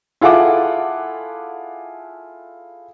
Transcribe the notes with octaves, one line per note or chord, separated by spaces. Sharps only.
E4 F4 G#4 A4 F#5 D6